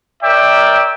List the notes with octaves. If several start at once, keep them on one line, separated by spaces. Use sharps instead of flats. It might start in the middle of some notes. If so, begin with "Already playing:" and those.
A#4 C#5 D5 E5 G5